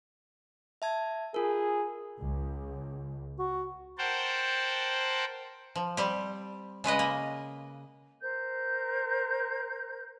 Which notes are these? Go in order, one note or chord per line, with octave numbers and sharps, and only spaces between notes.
E5 A5 G#6
F4 G#4 A#4
C#2
F#4
A#4 C5 F#5 G5 A5
F3
G3 C4 G4
C#3 G#3 B4 D#5
A#3
A#4 C5 G6